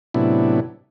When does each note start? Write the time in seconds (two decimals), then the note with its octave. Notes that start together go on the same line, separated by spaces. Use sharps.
0.14 A2 C3 F#3 B3 D4 E4